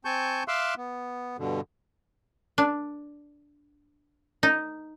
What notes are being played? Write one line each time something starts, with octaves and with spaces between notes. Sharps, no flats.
C4 G#5 A5 C#6 G6
E5 F5 C6 D6 E6 F#6
B3
G2 B2 D3
D4
D#4